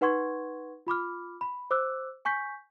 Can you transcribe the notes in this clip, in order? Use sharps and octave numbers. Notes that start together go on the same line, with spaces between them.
D#4 B4 F#5 C6 C#6 G#6
F4 B5 D6 F6
B5
C5 D6 E6 F#6
G#5 C#6 G6 B6